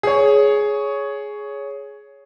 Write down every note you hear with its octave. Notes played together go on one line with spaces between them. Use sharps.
G#4 C#5